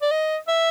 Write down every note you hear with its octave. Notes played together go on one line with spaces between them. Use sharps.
D5
D#5
E5